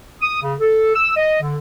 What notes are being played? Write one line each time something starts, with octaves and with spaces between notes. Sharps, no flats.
D#6
C#3
A4
E6
D#5
D3